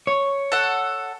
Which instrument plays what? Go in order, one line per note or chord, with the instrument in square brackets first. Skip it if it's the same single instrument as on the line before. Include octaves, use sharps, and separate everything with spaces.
[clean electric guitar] C#5
[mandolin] A4 F#5